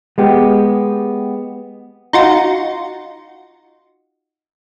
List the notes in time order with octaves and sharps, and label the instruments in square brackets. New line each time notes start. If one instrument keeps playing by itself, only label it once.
[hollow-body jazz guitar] G#3 B3 G4
[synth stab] D#4 F4 F#4